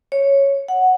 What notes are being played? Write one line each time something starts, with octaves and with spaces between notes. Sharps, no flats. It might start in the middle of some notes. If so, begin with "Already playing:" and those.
C#5
F#5